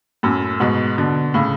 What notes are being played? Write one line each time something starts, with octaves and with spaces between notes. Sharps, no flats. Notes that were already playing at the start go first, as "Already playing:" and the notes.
F#2 A2
G#2 B2
B2 D3
A2 C#3